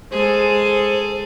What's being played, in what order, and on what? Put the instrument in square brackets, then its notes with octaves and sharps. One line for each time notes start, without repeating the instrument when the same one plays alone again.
[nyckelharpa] G#3 [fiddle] G#4 A4 [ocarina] C5